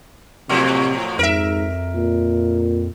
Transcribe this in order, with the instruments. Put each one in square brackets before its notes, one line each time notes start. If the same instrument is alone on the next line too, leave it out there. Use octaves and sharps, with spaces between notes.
[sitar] F2 A2 F#3 [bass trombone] C3
[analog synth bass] F2 [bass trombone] G#2 [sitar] A#4 E5
[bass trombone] A#2